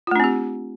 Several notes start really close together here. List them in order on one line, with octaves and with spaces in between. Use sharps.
F4 A3 D4 C4 G4